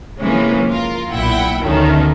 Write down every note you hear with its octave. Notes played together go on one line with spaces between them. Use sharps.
C3 E3 F3 G#3 A#3 C#4
F4 A#4
B1 A#2 E4 F#5 G5
D2 B2 D3 D#3 A3 C#4